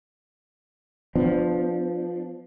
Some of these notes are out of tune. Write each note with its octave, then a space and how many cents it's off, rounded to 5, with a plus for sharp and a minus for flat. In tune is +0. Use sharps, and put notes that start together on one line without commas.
F3 +5 B3 +30 D4 +25